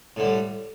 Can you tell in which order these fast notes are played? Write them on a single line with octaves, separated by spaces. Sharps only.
A2 D3 G3